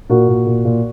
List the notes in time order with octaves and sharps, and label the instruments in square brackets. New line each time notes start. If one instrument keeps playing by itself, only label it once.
[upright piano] A#2 F#4 A#4
A#2
A#2
A#2